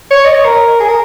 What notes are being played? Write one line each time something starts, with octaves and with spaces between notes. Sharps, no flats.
C#5
D#5
C#5
A#4
G#4
A#4